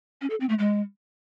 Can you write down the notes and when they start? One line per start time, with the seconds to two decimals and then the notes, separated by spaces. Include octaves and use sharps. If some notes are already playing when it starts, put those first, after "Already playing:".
0.21 C#4
0.30 A4
0.40 C4
0.49 A3
0.59 G#3